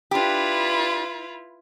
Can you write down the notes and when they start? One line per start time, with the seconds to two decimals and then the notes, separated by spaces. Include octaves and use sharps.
0.11 D4 E4 F4 G4 B4